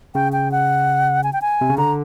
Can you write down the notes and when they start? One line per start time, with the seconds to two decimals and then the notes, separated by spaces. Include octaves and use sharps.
0.15 C#3 G5
0.33 G5
0.52 F#5
1.24 G#5
1.33 G5
1.42 G#5
1.61 C3
1.70 C#3
1.78 D3 A#5